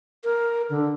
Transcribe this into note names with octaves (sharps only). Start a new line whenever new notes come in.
A#4
D3